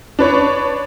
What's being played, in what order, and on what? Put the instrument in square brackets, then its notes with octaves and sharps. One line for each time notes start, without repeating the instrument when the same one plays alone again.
[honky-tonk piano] D4 B4 C#5